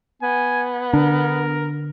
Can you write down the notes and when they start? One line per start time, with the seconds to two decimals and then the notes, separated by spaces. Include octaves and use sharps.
0.22 B3 G#5
0.94 D3 D4 A#4